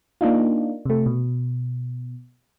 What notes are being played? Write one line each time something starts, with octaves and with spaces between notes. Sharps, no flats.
A#3 D4 D#4 F4
C3 A3
B2